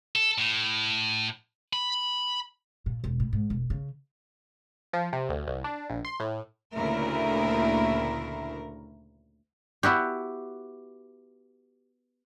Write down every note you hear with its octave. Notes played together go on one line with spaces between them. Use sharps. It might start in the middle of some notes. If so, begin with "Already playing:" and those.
A4
A2
B5
A#2
E1
A2
G#2
E1
C#3
F3
C3
D2
C2
D4
A#1
C6
A2
D2 A#2 C#3 A3 E4 A#4
B3 E4 F#4 G4